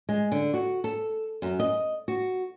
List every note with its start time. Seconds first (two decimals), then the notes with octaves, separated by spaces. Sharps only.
0.09 G#3
0.32 D3
0.54 F#4
0.84 A4
1.42 F#2
1.60 D#5
2.08 F#4